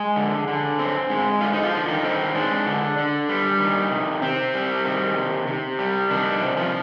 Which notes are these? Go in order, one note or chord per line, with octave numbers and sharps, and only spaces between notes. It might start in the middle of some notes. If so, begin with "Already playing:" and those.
Already playing: G#3 G#4
D3
D3
C4
G#3
D3 F4
D#4
F3 F4
D3
D#3 D#4
C4
G#3 D4
D3
D3
G3
D#3
C3
C3 C4
G3
D#3
C3
C3
G3
D#3 D4
C3
F3 F4